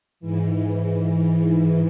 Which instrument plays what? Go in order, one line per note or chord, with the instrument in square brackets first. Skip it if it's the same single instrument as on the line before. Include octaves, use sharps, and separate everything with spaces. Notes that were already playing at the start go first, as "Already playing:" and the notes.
[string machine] G#2 E3